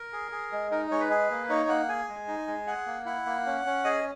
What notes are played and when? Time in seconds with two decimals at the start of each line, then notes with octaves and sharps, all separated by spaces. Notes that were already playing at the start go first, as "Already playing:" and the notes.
Already playing: A#4
0.13 G#4
0.32 G#4
0.52 G#3
0.71 D#4 A#4
0.91 G#3 C#5
1.00 B4
1.11 G#4
1.31 A#3
1.49 D#4 C#5
1.69 A#3 F#5
1.89 G#4 G#5
2.09 G#3
2.28 D#4
2.47 G#3
2.67 G#4 F#5
2.86 A#3
3.06 E4 F#5
3.26 A#3
3.46 C#4
3.66 C#4
3.84 G#4 D#5